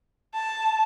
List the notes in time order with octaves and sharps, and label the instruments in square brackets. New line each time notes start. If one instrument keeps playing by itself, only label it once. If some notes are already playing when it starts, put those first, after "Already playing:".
[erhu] A5